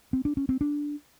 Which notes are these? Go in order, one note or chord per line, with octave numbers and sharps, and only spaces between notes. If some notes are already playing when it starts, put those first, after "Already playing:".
C4
D4
C#4
C4
D4